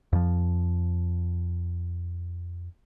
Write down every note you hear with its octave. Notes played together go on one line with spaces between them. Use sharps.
F2 F3